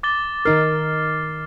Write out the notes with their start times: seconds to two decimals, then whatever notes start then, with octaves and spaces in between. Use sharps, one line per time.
0.03 D6 A6 G7
0.45 D#3 D#4 A#4 F6 C7